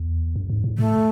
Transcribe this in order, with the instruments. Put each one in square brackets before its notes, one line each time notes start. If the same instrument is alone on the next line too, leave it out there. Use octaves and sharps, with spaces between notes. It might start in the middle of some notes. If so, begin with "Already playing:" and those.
Already playing: [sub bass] E2
F#2
G#2
A2
[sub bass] A2 [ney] A3